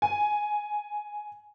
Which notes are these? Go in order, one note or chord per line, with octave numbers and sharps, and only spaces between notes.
G#5